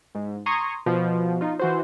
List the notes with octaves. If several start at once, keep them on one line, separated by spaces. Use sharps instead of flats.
G#2
A#5 C6 C#6 D#6 G#6
B2 F3
D#4 F4
E3 F#4 C5